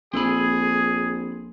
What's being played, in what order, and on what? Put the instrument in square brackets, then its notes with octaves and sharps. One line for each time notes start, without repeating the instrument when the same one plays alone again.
[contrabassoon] A#1 [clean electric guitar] C4 A4 B5 [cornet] G#4